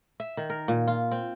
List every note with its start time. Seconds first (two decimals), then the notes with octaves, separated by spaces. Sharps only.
0.20 E5
0.37 D#3
0.50 A#4
0.68 A#2
0.87 F4
1.11 C4